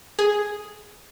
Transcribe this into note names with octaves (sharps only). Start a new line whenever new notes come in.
G#4